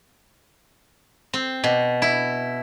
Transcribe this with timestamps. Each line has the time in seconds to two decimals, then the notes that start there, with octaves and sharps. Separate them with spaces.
1.34 C4
1.64 B2
2.02 E4